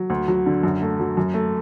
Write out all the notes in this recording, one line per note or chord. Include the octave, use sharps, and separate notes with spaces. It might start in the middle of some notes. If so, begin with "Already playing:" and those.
Already playing: F#3
D2
F#3
D3
F#2
A3
F#3
F#2
A3